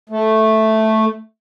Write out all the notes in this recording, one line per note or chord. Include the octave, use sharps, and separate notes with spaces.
A3